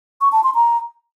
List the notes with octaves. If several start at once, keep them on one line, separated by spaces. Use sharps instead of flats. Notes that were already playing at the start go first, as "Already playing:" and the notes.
C#6
A5
C6
A#5